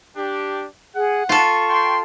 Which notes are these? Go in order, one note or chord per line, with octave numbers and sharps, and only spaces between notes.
D4 G4
G#4 F#5
F4 A4 C#6
G5 C6